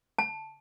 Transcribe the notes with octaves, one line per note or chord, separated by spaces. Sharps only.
A5